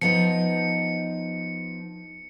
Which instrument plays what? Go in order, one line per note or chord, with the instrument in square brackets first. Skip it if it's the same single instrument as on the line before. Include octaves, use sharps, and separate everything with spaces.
[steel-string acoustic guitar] F3 B3 D#4 [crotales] C#7